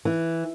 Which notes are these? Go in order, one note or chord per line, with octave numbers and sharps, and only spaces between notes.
E3